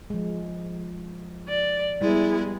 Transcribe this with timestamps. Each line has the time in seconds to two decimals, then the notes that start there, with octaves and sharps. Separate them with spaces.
0.10 F3 G#3
1.48 D5
2.01 G3 G#3 B3 E4